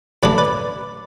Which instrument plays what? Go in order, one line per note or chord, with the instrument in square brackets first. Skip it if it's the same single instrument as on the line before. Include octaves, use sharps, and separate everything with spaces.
[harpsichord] A2 E3 A3 D4 [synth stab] B4 D5
[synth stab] B4 D5